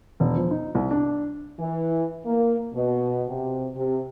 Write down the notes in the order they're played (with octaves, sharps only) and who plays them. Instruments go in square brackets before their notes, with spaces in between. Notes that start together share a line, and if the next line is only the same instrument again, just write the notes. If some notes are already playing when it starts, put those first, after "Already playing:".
[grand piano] E1
F3
D#4
C2
D4
[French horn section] E3
A#3
B2
C3
C3